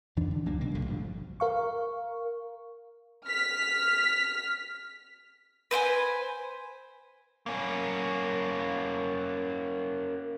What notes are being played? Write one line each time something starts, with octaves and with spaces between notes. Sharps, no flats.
F2 E3 D4
D3
C#2 F#3 A#3 D4
B2 A#3
C2 G2 B2 D3
A1 G2 F3
A#4 F5 C#6
F6 B6
B4 C5 G5 G#5
A#3 C#4